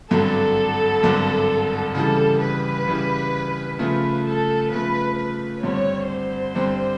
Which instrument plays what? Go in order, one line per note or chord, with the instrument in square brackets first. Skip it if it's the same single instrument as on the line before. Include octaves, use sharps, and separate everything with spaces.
[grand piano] G#1 G2 D3 F#3 [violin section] A4
[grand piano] G#1 G2 D3 F#3
[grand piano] C#3 E3 G3 [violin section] A4
[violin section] B4
[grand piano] C#3 E3 G3
[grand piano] C#3 F3 A3 [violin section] B4
[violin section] A4
[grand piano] C#3 F3 A3 [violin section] B4
[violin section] B4
[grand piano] G2 D3 G3 C4 [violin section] C#5
[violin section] C5
[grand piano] G2 D3 G3 C4